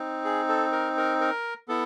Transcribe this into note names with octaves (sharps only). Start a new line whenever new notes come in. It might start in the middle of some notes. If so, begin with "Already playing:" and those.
Already playing: C4 D#4
G#4
A4
A#4
A#4
A#4
B3 E4 A4